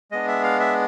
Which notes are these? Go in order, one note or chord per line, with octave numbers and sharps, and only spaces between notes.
G#3 B3 D4 D#5
E5
F5
E5